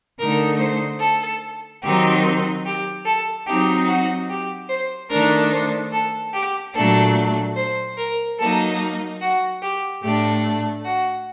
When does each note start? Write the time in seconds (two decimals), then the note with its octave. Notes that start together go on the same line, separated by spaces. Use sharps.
0.19 D3 A3 D#4 A#4
0.60 C5
1.01 A4
1.83 D#3 F#3 C4 D#4 G4
2.66 G4
3.06 A4
3.47 F#3 C4 D#4 G4
3.88 F#4
4.30 G4
4.70 C5
5.11 D#3 A3 D4 A#4
5.52 C5
5.93 A4
6.34 G4
6.75 A#2 F#3 A3 D4 A4
7.56 C5
7.97 A#4
8.38 F#3 A#3 D#4 A4
9.22 F#4
9.63 G4
10.03 A2 A3 D4 G4
10.86 F#4